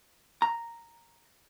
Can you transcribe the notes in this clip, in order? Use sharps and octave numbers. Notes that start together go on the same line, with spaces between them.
A#5